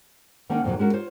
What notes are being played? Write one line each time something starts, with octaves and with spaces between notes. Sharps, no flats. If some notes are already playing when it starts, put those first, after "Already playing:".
D#3 A#3 C#4 D4 F#5 G5
F2 A#2 D#3 E3 F#3
G#3 C#4 F#4 A#4
F4 C5 C#5